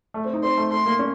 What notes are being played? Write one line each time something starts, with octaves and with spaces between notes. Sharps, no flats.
A3
C4
D#4
C4 C6
A3
A3 C6
A#3
C#4